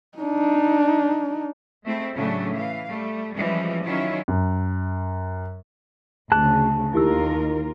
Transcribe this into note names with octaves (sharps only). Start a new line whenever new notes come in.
D4 D#4
G#3 A3 C4 E4
A2 C#3 F#3 A3 C#4 D4
E3 F5
G3 A3
E3 F3 G3 G#3 C#4
D#3 F#3 C#4 E4 F4
F#2
D2 C#3 G#4 A5 F#6
D#2 D#3 E4 F4 G4 A#4 E6